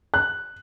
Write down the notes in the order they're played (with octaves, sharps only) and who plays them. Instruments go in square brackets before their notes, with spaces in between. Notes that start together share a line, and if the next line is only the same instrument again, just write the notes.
[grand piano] F#6